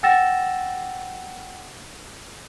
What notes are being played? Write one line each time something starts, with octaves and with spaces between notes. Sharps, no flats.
F#5 G5 E6 A6 A#6 E7